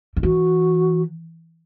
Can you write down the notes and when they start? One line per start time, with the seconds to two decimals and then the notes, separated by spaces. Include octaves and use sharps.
0.16 D#3
0.23 E3 F#4